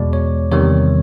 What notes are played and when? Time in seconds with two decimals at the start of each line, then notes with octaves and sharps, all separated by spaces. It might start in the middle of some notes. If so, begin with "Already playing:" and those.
Already playing: E2 B2 G#3 D5
0.13 C#5
0.51 E2 C3 D#3 G3 C#5